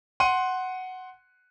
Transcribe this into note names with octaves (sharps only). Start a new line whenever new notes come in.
F#5 C6 D#7